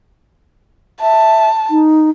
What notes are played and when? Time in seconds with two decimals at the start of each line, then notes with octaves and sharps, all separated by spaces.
1.01 E5 A5
1.71 D#4